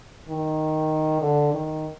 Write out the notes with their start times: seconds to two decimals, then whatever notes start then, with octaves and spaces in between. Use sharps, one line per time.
0.29 D#3
1.22 D3
1.54 D#3